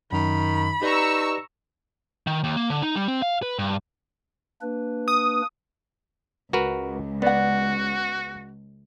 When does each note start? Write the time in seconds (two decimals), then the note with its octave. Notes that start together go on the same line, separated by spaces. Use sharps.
0.12 F#2 D#3 B5
0.82 D#4 G4 B4 D5 A#5 C#6 E6
2.27 D#3
2.44 D#2
2.57 A#3
2.70 D3
2.82 D#4
2.96 G3
3.08 C4
3.22 F5
3.42 B4
3.59 G2
4.61 A#3 D4 B4
5.08 D#6
6.53 C#2 F#4 A#4 B4
7.22 B3 F#4 D5 F#5